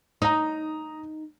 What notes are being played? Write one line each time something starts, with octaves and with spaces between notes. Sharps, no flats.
D#4 A#5 D#6